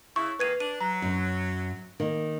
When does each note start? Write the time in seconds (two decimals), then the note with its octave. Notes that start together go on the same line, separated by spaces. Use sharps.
0.16 C#3 E4 C#6
0.39 D#3 A#3 G#4 B4 G#6 D#7
0.60 D4 D#7
0.81 F#3 A#5
1.02 F#2
2.00 D#3 A#3